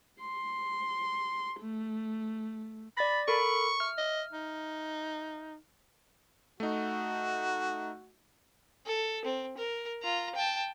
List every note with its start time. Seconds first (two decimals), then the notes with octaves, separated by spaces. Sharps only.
0.20 C6
1.61 A3
2.97 D5 B5 A6 A#6
3.28 A4 A#4 B5 C#6
3.80 E5 F6
3.98 D#5
4.32 D#4
6.60 A3 D#4 F#4
8.86 A4
9.25 C4
9.58 A#4
10.02 F4 A#5
10.35 G5 A5